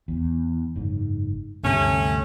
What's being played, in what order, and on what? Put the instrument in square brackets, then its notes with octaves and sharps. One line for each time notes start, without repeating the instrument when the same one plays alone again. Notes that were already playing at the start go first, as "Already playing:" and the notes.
[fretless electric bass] E2
F#1 G#2
[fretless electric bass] D2 G2 C3 [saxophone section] A3 C#4